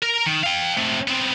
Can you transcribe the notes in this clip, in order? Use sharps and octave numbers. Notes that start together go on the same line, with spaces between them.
A#4
D#3
F5 G5
A3 C4
B3 C4